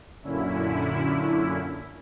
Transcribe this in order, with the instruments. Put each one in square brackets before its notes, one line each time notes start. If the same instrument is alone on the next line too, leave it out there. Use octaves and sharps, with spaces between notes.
[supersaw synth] F#2 A#2 D3 C#4 E4